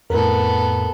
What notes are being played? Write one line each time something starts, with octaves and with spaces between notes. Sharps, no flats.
F2 A2 B3 A4 A#4